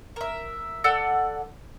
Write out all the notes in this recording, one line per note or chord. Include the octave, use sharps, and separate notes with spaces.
A#4 E5
A4 D5 F#5 E6